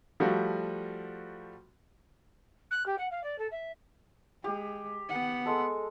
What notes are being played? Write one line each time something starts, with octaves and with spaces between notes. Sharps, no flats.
F3 G3 A3 F#4
F#6
G4
F#5
F5
D5
A4
E5
G#3 G4
B3 F#5
G#3 A4